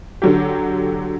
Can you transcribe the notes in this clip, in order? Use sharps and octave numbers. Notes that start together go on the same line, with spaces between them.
D3 F#3 G4